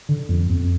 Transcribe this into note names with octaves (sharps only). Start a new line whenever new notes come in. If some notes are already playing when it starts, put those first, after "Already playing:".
D3
F2
F2